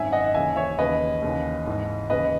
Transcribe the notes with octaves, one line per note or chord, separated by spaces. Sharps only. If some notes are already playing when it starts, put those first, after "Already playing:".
Already playing: G#1 F#2 D#3 E5 G#5
D#5 F#5
F#5
D#2 C#3 E3 E5 G#5
C#5 E5
D#2 C#3 E3 B4 D#5
D#2 C#3 E3
G#1 G#2 E3
D#2 C#3 E3 B4 D#5